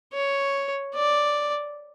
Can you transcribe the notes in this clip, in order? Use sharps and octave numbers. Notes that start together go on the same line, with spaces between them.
C#5
D5